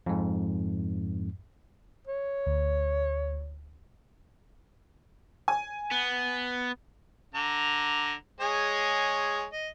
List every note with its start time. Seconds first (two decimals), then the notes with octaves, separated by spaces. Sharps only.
0.06 F2 G#2
2.08 C#5
2.46 D2
5.48 G#5
5.91 B3
7.34 D3 A#5
8.40 G#3 G#4 C#5
9.53 D#5